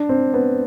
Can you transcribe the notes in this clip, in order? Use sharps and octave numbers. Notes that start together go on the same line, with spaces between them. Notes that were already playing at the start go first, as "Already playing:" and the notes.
Already playing: D4
C4
B3